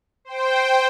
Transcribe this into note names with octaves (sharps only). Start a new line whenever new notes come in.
C5 G5